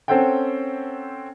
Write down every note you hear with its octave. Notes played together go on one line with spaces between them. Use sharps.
C4 C#4 A4 C5 F#5 G5